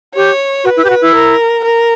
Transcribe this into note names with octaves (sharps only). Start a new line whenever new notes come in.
G4 C#5
F#4 B4
E4
G4
F#4
E4
A#4
A#4